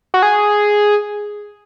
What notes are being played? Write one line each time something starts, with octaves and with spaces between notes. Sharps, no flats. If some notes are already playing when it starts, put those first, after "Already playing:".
F#4
G#4